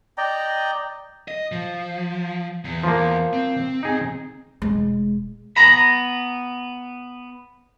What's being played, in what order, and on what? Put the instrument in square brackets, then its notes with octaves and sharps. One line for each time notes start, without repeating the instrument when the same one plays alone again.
[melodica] D5 D#5 G5 A#5
[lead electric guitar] D#5
F3
E2
[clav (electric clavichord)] F3 A#3
[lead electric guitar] C4
[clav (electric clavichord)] D#4 G#4
[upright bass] E1 G#3
[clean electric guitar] B3 A#5 B5